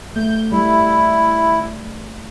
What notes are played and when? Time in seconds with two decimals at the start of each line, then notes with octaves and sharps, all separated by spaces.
0.16 A3 G6
0.52 G3 E4